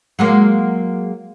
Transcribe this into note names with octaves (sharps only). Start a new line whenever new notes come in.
F#3 G#3 A#3